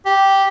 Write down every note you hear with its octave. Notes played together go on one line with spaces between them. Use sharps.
G4